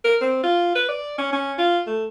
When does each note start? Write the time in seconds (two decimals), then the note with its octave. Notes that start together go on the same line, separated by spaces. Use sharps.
0.04 A#4
0.21 C4
0.44 F4
0.76 B4
0.89 D5
1.18 C#4
1.33 C#4
1.58 F4
1.87 A3